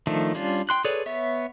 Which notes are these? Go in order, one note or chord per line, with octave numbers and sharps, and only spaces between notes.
D#3 F3 A3 D4
G3 C#4 D4 F4
G5 C6 F#6
G#4 A4 B4 C#5 D5
B3 C#5 E5